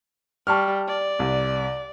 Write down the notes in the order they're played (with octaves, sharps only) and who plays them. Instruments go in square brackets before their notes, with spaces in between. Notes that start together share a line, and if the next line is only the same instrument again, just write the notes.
[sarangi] G3 [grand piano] A5 C#6 F6
[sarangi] D5
[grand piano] C2